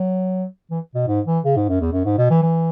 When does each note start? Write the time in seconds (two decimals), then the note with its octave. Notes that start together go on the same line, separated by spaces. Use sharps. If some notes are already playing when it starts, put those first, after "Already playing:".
Already playing: F#3
0.71 E3
0.95 B2
1.08 G#2
1.26 E3
1.44 C#3
1.56 G#2
1.69 F#2
1.81 E2
1.92 F#2
2.05 G#2
2.18 B2
2.30 E3
2.43 E3